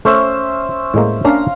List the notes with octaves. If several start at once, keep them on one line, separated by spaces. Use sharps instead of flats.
A3 C#4 C5 E5
A2 G#3 A#3
A#3 C#4 D4 F5 A#5